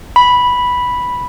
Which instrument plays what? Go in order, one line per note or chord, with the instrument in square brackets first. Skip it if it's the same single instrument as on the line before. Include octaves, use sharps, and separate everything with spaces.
[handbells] B5